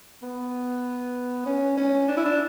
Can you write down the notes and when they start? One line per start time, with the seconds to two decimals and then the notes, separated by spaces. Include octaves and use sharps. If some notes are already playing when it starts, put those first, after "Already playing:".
0.23 B3
1.46 C#4
1.77 C#4
2.08 D4
2.17 E4
2.25 D4